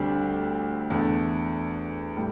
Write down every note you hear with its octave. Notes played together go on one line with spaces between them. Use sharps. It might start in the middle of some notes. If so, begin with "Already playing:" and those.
Already playing: D2 D3 G3 C4
E2 D3 A3
A2 G3